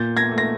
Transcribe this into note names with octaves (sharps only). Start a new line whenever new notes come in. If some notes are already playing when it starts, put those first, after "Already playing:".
Already playing: A#2 G6 A6
G#6 A#6
A3
A#6